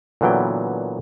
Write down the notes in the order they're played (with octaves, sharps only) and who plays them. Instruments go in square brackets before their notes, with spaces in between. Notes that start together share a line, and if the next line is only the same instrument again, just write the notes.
[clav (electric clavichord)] A#2 D3 E3 F#3 B3 G5